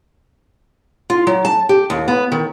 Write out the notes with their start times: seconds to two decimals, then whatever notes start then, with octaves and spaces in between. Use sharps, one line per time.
1.10 F4
1.27 F#3
1.45 A5
1.69 G4
1.90 D#2
2.08 B3
2.32 D#3